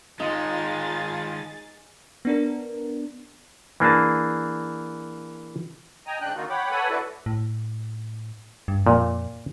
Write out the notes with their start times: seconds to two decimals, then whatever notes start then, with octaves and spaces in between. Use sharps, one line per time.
0.20 D#3 G#3 D#4 F4 G#4 A6
2.25 B3 D4 A#4
3.80 E3 A#3 D4 G#4 A5
6.07 D#5 G5 G#5 A#5
6.21 G#2 C#3 D4 G5 F#6
6.35 D3 D#3 A#3 D#4 F4 F#4
6.50 C#5 F#5 G5 B5 D6
6.71 A4 B4 C#5 F#5 G#5 B5
6.89 D4 E4 F#4 A4 B4
7.26 A2
8.68 G2
8.87 F2 A#2